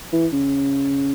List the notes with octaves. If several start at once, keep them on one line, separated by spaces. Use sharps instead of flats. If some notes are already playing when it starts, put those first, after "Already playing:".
E3
C#3